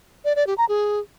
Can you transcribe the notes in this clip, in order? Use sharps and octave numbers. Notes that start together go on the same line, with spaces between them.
D5
D5
G4
A#5
G#4